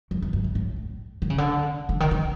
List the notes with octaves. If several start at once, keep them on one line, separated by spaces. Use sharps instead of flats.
F2
F2
F#2
G2
A2
D3
C#3
D3
D3
D#3
D3